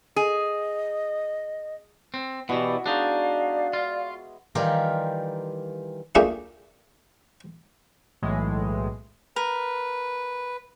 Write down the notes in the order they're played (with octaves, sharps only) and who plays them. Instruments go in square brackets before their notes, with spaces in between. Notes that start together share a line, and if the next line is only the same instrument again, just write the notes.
[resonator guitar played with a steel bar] G#4 [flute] D#5
[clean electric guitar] C4
[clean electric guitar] B2 E3 [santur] B3 E4 F#4 [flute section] G4 D5
[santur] G#3 C#5 [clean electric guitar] D4 D#4 [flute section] D5 F5
[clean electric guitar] F4
[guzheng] D#3 E3 G3 F4 G4 A#4
[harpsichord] A3 A#3 D4 F4 G4 G#4
[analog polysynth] B1 A2 E3 G#3
[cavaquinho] A#4 [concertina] B4